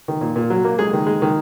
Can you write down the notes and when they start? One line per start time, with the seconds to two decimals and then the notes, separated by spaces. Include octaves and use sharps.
0.08 D#3
0.21 A#2
0.36 A#2
0.50 F#3
0.64 A#3
0.79 G#3 G#4
0.93 D#3
1.07 G#3
1.22 D#3